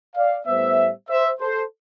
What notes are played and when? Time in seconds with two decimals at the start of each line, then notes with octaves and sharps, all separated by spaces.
0.16 D5 F5
0.47 A2 G3 B3 C5 E5
1.10 C5 E5
1.40 A4 C5